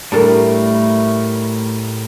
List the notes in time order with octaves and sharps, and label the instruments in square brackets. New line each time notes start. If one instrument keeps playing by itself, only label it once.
[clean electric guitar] A2 [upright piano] G3 A#4 [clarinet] A3 [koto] D4 A4